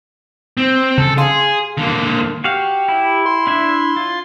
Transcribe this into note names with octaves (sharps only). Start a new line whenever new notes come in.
C4
C#3 A4
G#4 F5 C6
D3 A#3
F#4 G4 F5
E4
C6
D4 E4 E5
F4